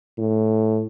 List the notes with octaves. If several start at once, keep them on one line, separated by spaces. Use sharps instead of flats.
A2